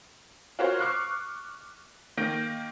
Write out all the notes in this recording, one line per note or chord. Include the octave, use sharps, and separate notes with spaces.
F4 F#4 A#4 C5 C#5 F5
C#6 D6 F6 F#6 C7
D#3 A#3 G6 A#6 D7